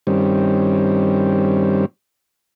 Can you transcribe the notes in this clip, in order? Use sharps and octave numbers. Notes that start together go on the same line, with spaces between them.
G2 D#3 G3 C4 C#4